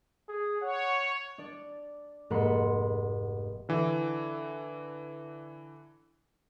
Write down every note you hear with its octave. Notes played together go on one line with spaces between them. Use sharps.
G#4
C#5 F#5
D4 D5
F1 G#2 A#3 F#5 B5 C6
D3 E3